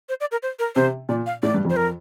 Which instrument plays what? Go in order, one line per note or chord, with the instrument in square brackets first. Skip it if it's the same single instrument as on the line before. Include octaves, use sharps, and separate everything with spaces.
[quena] C5
D5
A#4
C5
A#4
[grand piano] C3 [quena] C5
[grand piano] A#2 [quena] D5
[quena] F5
[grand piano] A2 [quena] D5
[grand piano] G2
F2
[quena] C5
A#4